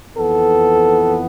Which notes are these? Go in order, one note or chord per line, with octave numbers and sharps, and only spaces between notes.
F2 E3 B3 A4